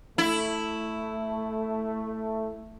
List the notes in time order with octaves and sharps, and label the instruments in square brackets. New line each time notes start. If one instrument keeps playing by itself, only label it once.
[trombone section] A3 [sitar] E4